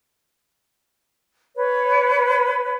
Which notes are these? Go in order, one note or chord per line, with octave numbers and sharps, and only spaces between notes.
B4 C#5